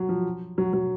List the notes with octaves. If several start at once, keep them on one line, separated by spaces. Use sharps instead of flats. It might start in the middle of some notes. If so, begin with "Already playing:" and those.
Already playing: F#3
F3
F#3
F#3